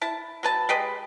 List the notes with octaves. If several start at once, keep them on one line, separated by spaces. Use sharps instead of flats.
E4 A5
F#3 B4 A5
G#3 G4 B4 D#5